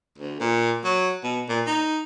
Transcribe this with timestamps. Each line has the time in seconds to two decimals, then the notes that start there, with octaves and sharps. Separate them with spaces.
0.18 D2
0.40 A#2
0.84 F#3
1.23 B2
1.49 A#2
1.66 D#4